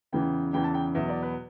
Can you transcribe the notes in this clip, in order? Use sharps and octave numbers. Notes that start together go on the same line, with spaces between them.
E2 C#3 E3 G5
E2 C#3 E3 G5
A5
G5
E2 B2 F#3 E5
D5
B4